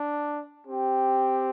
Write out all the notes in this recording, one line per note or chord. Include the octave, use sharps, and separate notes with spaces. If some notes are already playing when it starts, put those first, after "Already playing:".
Already playing: D4
C4 G4